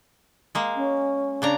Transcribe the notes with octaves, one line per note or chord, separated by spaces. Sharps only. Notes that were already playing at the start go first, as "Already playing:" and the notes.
G#3 A#3
C#4
C#3 D4 A#5